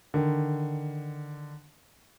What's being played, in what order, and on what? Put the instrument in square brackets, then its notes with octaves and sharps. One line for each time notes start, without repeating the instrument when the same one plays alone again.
[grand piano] D3 D#3